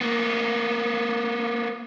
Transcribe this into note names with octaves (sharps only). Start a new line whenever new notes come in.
A#3 B3